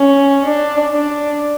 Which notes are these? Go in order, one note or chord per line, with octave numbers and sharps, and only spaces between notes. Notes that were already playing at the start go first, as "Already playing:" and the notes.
Already playing: C#4
D4
D4